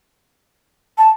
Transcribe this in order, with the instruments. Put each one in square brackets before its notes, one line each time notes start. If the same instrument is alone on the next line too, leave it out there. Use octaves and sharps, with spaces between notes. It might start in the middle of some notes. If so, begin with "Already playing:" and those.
[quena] A5